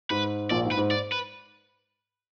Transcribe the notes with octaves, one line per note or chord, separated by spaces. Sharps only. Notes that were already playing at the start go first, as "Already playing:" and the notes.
G#2 B4
A#1 A#2 D5
G#2
B4
G#2
D5
B4